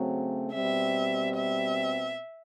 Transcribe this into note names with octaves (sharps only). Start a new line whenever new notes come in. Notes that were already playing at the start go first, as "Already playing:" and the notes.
Already playing: C#3 F#3 A3 C4
B2 G3 C4 E5
E5